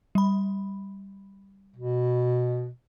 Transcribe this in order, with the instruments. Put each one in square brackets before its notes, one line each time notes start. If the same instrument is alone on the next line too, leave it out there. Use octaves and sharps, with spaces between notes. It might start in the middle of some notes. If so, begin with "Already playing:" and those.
[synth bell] G3 B5
[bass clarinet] B2